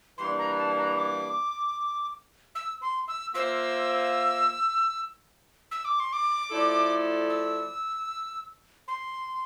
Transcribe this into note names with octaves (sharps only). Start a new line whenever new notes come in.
E3 G3 A#3 D4 C6
A#5
A5
A#5
D6
E6
C6
E6
A#3 F4 C5 E5 E6
E6
D6
C6
D6
F3 A3 E4 A4 D5
E6
C6